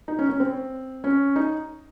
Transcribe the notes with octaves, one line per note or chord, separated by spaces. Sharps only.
D#4
C#4
C#4
C4
C#4
D#4